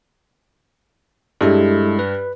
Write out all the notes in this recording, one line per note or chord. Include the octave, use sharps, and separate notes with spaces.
G2 G#3 E4 A4
B4